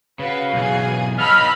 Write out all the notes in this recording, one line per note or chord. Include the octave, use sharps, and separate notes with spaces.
C#3 F#4 B4 F5
B1 E3 G#4 G#5
B3 D#4 D#5 A5 B5 C6 E6 F6